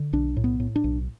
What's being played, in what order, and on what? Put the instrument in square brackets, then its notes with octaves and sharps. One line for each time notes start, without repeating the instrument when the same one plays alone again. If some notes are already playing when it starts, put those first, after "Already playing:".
Already playing: [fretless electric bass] D3
B1 D4
A2
B3
A2
D4
B1